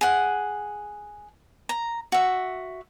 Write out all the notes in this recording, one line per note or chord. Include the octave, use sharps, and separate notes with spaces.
G#4 F#5
A#5
F#4 E5